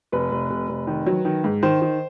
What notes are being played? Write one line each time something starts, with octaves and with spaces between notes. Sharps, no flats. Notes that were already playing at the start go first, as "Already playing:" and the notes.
F1 B4
F1
F1
F1
D#3
F#3
D#3
G#2
D#3 C5
D#3